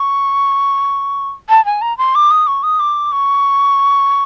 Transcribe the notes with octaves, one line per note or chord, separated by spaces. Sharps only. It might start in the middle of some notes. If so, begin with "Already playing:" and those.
Already playing: C#6
A5
G#5
A#5
C6
D6
D#6
C#6
D#6
D6
C#6